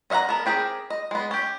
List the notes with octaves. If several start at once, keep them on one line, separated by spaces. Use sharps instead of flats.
C#4 D#5 F5 F#5 A#5
B3 A4 A#4
C4 G4 G#4 A#4
D#5
G#3 B3
C#4 G4